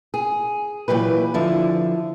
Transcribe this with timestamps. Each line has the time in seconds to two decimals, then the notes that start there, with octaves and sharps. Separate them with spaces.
0.14 G#4
0.88 A#2 E3 F#3 G4 B4
1.34 D3 F3 E4